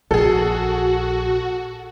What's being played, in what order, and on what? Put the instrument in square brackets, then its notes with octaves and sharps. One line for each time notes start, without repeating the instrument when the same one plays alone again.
[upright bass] A#1 [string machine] F#4 [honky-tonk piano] G#4 A4